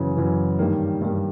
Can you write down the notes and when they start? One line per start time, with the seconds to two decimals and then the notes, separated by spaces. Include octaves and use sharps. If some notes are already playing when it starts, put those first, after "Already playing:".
Already playing: F#2 C#3 E3
0.17 F#2 C#3 E3
0.59 G2 D#3 G3 A#3
1.01 G2 D#3 G3 A#3